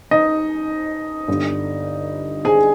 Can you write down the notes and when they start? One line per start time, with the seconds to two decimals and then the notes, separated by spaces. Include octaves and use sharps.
0.11 D#4 D#5
1.28 G1 G2 D3
2.45 G#4 G#5